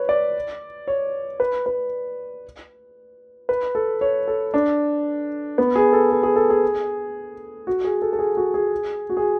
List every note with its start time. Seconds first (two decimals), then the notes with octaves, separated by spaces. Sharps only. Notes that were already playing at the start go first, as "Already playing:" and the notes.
Already playing: B4 C#5
0.09 D5
0.88 C#5
1.40 B4
1.66 B4
3.49 B4
3.75 A4
4.01 C#5
4.28 A4
4.54 D4
5.58 B3
5.76 G#4
5.93 A4
6.10 A4
6.23 G#4
6.36 A4
6.50 G#4
7.67 F#4
7.84 G#4
8.02 A4
8.13 A4
8.19 G#4
8.37 F#4
8.54 G#4
9.10 F#4
9.17 G#4